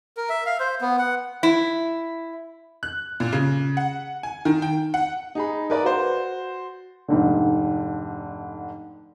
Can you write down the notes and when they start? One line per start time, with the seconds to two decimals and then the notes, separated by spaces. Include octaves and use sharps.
0.17 A#4
0.29 E5
0.46 F5
0.60 C5
0.81 B3
0.99 F#5
1.43 E4
2.83 F#6
3.20 A#2
3.33 C#3
3.77 F#5
4.23 G#5
4.45 D#3
4.62 G5
4.94 F#5
5.35 D#4 G#4 B5
5.70 A#4 B4 D5 B5
5.83 F#4 C5
7.08 F1 G#2 D3